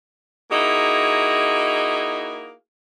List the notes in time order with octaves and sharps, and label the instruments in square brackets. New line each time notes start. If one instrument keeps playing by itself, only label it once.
[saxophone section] A#3 D#4 E4 F#4 G#4